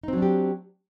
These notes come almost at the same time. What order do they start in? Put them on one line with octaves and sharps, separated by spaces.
D#4 C4 F#3 D4 G4